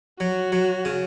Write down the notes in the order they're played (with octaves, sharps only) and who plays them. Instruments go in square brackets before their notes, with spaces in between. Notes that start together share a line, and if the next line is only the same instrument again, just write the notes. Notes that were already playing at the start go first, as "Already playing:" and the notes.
[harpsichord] F#3 [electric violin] F#4
[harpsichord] F#3
C#3